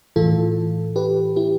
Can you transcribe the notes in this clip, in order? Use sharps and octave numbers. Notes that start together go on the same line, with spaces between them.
A2 E3 F4 A4
G4 B4
E4 G4